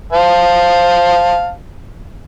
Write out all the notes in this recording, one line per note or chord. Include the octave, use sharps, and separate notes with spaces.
C5 F5 A5